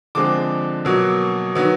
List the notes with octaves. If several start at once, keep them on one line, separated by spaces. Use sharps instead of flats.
D3 F3 G#3 C4 D6
B2 F#3 A#3
D#3 F#3 B3